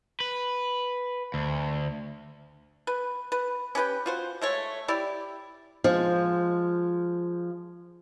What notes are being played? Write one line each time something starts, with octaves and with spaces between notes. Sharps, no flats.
B4
D2
B4
B4
C#4 G4 B4 G5
F4 F#4 C5
G#3 A3 C#5
E4 G4 D5
F3 G#3